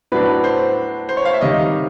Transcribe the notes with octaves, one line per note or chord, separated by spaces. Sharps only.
A2 F#3 B3 D4 B4
C5
C5
C#5
F5
E5
C3 D#3 G3 C4 D#5